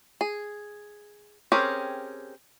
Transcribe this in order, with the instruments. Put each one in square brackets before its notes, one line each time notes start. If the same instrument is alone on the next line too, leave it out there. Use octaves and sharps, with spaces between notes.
[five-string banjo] G#4
C4 C#4 G4 G#4 A#4